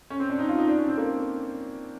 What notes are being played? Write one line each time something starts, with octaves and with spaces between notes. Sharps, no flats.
C#4
C4
D4
D#4
F4
D#4
D4
C#4
C4
A#3